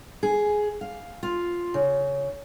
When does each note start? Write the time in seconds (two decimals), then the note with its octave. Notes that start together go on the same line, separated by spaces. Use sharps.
0.23 G#4
0.81 F5
1.23 F4
1.74 C#3